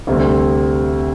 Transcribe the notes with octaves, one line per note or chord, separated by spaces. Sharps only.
D2 C3 G3 C4